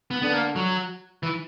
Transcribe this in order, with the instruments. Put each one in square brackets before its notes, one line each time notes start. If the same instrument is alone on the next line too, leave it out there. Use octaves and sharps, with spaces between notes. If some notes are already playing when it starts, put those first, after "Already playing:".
[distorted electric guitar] B3
[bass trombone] D3 [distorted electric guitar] B3
[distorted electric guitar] A#3
F#3
E3